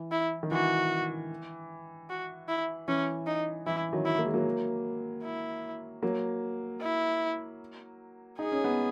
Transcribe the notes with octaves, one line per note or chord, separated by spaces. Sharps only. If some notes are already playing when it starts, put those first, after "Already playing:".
Already playing: E3
E4
D#3
E3 F#4
F#4
E4
E3 C#4
D#4
E3 E4
D#3 F#3
E4
A#3
G#3
F#3 A#3
E4
F#3 A#3
E4
D#4 G#4
C#4
B3